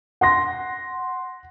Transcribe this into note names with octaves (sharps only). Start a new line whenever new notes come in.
F#5 C6 A#6